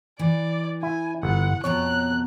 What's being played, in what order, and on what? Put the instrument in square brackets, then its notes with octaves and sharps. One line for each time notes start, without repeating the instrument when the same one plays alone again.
[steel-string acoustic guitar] E3 [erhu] D5
[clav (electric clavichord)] E4 [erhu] G#5
[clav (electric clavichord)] G1 [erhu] F#5
[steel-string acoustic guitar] F2 B2 A#5 [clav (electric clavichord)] C#5 [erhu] F#6